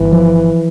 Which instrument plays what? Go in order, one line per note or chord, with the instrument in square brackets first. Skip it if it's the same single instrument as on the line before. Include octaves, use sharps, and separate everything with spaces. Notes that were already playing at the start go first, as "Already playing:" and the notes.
Already playing: [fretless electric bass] G1 [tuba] E3
[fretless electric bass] F3